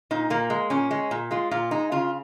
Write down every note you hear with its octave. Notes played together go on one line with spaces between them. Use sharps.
A#2 D#4
A#2 A#3
G#3
A#2 C#4
G#3
A#2
G#3 F4
A#2 F4
G#3 D#4
C#3 F4